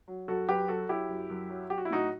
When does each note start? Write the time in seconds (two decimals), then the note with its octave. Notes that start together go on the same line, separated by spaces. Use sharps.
0.08 F#3
0.28 F#2 F#4 A4
0.48 F#2 G4 B4
0.68 F#3 F#4 A4
0.89 F#3 E4 G4
1.09 F#2
1.30 F#2
1.50 F#3
1.70 F#3 G4
1.78 F#4
1.85 E4
1.90 A2 D#4 F#4